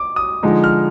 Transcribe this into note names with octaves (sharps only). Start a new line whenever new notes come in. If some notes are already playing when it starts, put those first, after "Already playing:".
Already playing: D6
D#6
D3 F3 G#3 D#4
F6